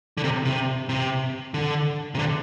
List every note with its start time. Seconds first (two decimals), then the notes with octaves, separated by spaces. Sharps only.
0.17 D3
0.24 C3
0.45 C3
0.89 C3
1.54 D3
2.15 C3
2.19 D3